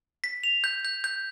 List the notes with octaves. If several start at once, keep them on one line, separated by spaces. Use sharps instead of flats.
B6
F7
G6
G6
G6